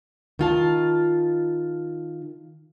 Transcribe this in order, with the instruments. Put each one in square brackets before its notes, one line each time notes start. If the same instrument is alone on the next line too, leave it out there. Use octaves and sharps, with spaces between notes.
[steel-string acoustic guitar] D#3 F4 A5